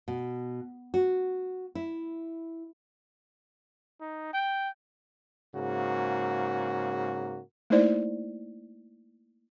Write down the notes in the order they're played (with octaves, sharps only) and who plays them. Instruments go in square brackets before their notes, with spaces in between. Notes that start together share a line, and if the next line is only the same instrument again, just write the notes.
[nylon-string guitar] B2
F#4
E4
[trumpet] D#4
G5
[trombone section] G#2 C#3 A#3 F#4
[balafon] A3 A#3 D#4 E4 C5 D5